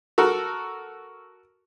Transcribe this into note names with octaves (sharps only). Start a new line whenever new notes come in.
F#4 A4 A#4